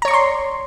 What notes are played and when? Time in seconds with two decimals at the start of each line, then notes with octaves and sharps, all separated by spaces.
0.02 A#5
0.05 C#5
0.08 C#6
0.11 D5
0.13 C6